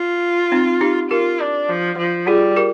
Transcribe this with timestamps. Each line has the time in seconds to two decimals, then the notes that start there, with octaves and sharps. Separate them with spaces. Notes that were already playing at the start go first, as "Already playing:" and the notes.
Already playing: F4
0.52 C4 D#4
0.81 D#4 G4
1.10 F4 G4 A#4
1.39 D4
1.69 F3
1.98 F3
2.27 G3 F4 G#4
2.56 G4 A#4